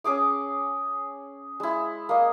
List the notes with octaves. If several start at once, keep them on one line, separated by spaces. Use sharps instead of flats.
C#4 G#4 D6 D#6
G#3 E4
A#3 D#5